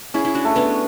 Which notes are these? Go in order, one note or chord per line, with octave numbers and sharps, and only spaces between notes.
C#4 E4 G#4
E4
D4 F#4
A3
B3 D4